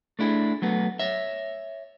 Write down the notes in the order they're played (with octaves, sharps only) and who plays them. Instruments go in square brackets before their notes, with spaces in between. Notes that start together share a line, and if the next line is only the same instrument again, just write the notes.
[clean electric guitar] A3 D4 E4 G#4
F#3 A3 B3
C#5 E5